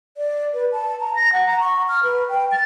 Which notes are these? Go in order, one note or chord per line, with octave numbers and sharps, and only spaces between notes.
D5
B4
A5
A#5
A#6
F#5
A#5
C#6
F6
B4
G5
A6